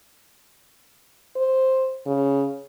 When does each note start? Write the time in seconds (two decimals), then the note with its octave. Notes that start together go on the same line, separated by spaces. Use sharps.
1.36 C5
2.06 C#3